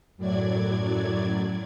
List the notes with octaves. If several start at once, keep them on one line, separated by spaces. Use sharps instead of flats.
F#2 A2 F#3 D5 G#6